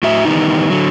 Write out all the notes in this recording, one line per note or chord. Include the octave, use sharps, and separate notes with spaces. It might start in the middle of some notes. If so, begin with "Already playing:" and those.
A2 F#4 E5
D#3 E3 G3 B3 D#4
D3 F#3